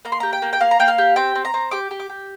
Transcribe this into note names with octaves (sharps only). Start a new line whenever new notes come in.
A#3 A#5
C6
G4 A#5
G5
A#3
G5
A#3 F5
A#5
A#3 G5
F5
G4
C4 G5
C4
A#5
C4
G4 D6
G4
D6
G4